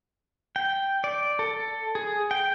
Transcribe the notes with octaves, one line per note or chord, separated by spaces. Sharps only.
G5
D5
A4
G#4
G5